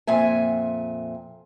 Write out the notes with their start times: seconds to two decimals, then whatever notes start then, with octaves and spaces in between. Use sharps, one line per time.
0.07 F2 A#2 E5 G#5